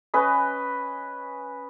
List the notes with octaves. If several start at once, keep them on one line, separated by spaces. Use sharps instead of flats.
C#4 B4 D#5